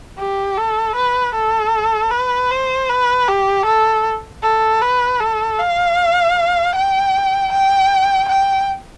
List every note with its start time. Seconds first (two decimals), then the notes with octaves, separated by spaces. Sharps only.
0.18 G4
0.57 A4
0.96 B4
1.35 A4
2.11 B4
2.51 C5
2.89 B4
3.28 G4
3.66 A4
4.43 A4
4.82 B4
5.20 A4
5.59 F5
6.75 G5
7.52 G5
8.29 G5